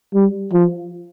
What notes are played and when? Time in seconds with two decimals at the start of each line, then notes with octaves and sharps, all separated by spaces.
0.14 G3
0.53 F3